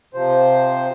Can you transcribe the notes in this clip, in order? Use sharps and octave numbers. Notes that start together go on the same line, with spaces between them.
C3 F3 C5